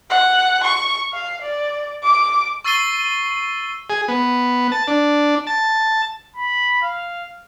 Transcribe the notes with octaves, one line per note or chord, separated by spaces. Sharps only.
F#5
C#6
F5
D5
D6
C#6 E6 A6 C7 D#7 G7
G#4
B3
A5
D4
A5
B5
F5